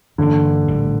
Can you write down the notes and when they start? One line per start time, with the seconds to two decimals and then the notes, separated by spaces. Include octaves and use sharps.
0.18 G2 D3 E3 A#3
0.68 A#1 A2 G3